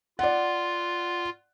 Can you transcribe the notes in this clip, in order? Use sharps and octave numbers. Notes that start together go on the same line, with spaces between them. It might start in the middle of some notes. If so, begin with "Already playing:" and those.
F4 D5 F#5